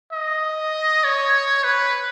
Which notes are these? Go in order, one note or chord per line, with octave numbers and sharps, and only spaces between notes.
D#5
C#5
B4